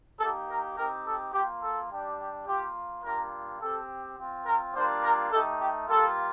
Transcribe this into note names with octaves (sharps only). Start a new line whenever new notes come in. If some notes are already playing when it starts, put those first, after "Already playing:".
A#3 D#4 G4 A4
A#4
C4 D#4 G4 A#4
A4
A#3 F4 G4
A4
G3 D4 G4
G4
A#3 F4 G4
G3 A#3 D4 F4 A#4
C4 G4 A4
C4 F4
A#4
G3 A#3 D4 F4 C5
A#4
A3 D#4 G4 A4
G4
G3 A#3 F4 A4